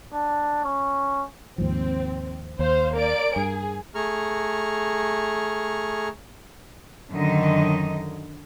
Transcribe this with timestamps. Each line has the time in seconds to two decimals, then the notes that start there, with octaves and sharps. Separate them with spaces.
0.13 D4
0.64 C#4
1.58 D#2 G#2 F3 C4
2.59 D#2 C5 F5
2.94 A#3 D5 D7
3.36 G2 G#4
3.95 A3 G#4 A#5 C#6 F6
7.11 F#2 D3 D#3 D#5